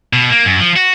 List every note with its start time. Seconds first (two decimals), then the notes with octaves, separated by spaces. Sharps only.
0.13 B2
0.31 A#3
0.45 F#2
0.60 F3
0.76 F#4